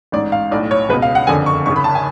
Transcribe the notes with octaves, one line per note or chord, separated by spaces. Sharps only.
A1 G#2 D5
F5
B1 A2 D5
C#5
C#2 B2 B4
F5
F#5
F#1 F2 D3 G#5
C#6
G#1 F#2 C#3 C#6
B5
A5
G#5